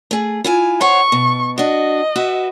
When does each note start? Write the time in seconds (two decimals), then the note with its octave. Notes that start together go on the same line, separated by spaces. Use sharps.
0.11 A3 G#4
0.44 E4 F4 G#5
0.81 C5 C#5 F#5 C#6
1.12 B2
1.58 D4 F#4 D#5
2.16 F#4 B4 E5